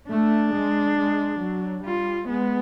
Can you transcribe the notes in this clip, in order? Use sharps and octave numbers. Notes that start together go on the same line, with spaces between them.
A3 D4
G#3
G#3
F#3
G3 F4
G#3 B3